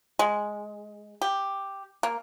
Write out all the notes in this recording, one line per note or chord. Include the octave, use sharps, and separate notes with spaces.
G#3
G4
A#3